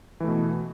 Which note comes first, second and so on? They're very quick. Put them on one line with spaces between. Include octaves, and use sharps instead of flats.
E3 A3 B2